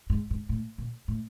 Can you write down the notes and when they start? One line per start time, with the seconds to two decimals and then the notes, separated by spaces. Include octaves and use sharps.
0.10 G#2
0.31 G#2
0.49 A2
0.78 A#2
1.08 A2